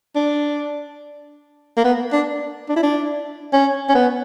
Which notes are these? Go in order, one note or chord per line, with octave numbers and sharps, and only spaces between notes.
D4
A#3
B3
D4
D4
E4
D4
C#4
C#4
B3